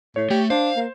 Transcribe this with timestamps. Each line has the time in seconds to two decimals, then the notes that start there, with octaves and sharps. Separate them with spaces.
0.16 A2 C#5
0.30 A3 G4
0.50 D4 C5 F5
0.76 A#3